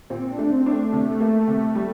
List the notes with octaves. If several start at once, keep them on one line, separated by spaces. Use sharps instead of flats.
A#2 C4
D4
A3
C4
D4
A3
C3
A#3
C3
G3